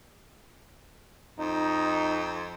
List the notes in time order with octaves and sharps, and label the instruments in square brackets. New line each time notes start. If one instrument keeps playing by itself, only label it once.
[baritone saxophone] F2 [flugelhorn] D#4